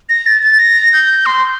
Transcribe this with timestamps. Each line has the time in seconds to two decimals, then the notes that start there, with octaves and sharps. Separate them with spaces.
0.09 A#6
0.26 A6
0.43 A6
0.59 A#6
0.93 G6
1.26 C6